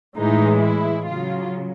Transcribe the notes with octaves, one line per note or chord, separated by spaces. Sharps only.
A2 E3 G#3 D#4
E4
C#3 F#3 F4